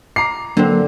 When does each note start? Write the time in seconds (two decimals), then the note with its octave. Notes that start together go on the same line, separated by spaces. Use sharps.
0.16 A#5 D6 C7
0.57 D3 F#3 A#3 C4 D4